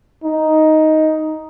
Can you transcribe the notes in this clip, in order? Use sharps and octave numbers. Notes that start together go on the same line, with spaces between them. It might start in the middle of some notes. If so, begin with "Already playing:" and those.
D#4